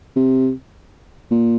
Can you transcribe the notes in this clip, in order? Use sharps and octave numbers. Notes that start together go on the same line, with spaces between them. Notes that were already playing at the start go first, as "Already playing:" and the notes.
C3
A#2